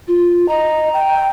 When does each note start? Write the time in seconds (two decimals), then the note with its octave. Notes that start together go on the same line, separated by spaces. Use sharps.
0.08 F4
0.48 D#5 A#5
0.94 G5